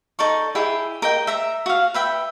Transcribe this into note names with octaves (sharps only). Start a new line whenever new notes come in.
D#4 A4 D5 C#6
E4 G4 G#4 G5
A#4 D#5 G5
E5 A#5
F#4 F5
B4 E5 G5